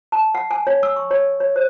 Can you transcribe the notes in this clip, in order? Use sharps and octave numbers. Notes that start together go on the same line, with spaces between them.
A5
F#5
G#5
C#5
E6
C#6
C#5
C#5
C5